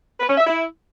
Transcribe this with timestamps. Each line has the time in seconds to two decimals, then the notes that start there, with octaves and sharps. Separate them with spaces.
0.20 B4
0.29 C#4
0.38 E5
0.47 E4